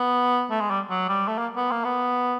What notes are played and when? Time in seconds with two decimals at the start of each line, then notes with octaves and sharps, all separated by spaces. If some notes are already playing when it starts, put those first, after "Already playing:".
Already playing: B3
0.50 A3
0.60 G#3
0.70 G3
0.90 F#3
1.08 G3
1.28 A3
1.38 A#3
1.56 B3
1.71 A#3
1.84 B3